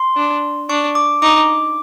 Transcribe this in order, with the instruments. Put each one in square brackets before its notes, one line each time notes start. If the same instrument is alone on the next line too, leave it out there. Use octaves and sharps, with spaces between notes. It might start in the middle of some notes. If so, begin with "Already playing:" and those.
Already playing: [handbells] C6
[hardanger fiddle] D4
[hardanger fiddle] D4 [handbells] C#6
[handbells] D6
[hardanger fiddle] D#4 [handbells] D6